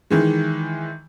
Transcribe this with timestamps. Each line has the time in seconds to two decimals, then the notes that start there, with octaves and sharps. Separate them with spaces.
0.10 D#3 E3 G#3